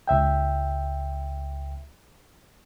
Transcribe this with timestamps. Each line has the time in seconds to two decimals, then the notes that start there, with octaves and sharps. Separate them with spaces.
0.08 C#2 E5 G5